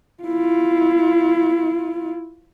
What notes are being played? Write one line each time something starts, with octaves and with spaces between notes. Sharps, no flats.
E4 F4